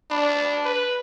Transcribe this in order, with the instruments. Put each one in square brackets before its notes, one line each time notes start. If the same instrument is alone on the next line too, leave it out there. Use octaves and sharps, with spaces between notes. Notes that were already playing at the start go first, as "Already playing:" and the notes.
[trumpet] D4 [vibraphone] B5
[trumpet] B4